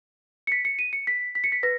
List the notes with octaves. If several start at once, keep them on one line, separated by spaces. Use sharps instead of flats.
C#7
B6
C#7
D#7
C#7
B6
B6
C#7
B6
B4 A#6